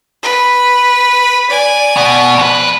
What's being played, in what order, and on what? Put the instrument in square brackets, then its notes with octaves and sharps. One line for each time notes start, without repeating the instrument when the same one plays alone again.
[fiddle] B4
D5 G#5
[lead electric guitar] B2
F2 B4